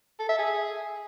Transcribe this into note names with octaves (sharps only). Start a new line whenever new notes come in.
A4
E5
G#4